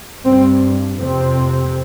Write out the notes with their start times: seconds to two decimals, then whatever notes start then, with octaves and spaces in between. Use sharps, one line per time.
0.24 G2 C4
0.99 F2 C3 C4